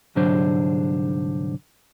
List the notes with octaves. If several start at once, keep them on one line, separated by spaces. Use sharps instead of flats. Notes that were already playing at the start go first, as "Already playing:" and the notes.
C2 G#2 D3 F#3 D4 C5